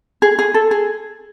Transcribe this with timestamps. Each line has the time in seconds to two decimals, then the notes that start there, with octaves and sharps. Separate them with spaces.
0.22 G#4
0.39 G#4
0.54 A4
0.71 G#4